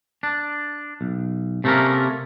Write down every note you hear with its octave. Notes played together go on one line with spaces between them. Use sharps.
D4
B1
C3 A3 A#3 C#4 A#4